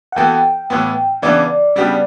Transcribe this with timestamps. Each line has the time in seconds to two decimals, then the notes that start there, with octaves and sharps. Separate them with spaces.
0.12 F#5
0.16 E3 B3 F#4 A4 G5
0.70 A2 E3 B3
1.22 C#3 E3 B3 D4 D5
1.76 C#3 G3 B3 D4 G4